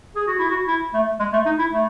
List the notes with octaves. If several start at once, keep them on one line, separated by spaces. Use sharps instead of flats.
G#4
F#4
E4
F#4
E4
A3
G#3
A3
D#4
E4
A3